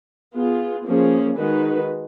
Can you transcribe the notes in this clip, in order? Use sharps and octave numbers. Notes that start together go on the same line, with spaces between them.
B3 F4 G#4
F3 A#3 C#4 G#4
D#3 G#3 D#4 F#4 B4